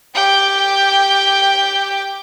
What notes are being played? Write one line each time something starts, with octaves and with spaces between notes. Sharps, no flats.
G4 G5